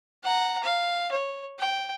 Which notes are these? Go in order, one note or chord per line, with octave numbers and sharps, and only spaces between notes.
F#5 A#5
F5
C#5
G5